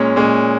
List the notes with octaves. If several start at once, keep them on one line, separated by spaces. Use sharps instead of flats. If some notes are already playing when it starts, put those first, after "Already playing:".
Already playing: A#2 G#3 C#4 C#5
A#2 G#3 C#4